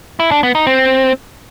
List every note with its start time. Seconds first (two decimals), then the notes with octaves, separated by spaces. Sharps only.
0.20 E4
0.31 D4
0.43 B3
0.55 D#4
0.67 C4